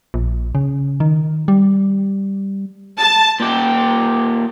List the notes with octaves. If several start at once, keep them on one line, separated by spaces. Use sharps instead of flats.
A#1
C#3
D#3
G3
A5
A#2 G4